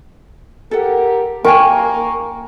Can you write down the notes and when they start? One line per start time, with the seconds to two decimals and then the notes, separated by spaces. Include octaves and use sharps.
0.71 G4 A4 A#4 F#5
1.44 A#3 A#4 G5 G#5 C#6